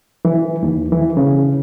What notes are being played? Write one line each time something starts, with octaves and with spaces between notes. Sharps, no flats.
E3
D#2
E3
C#3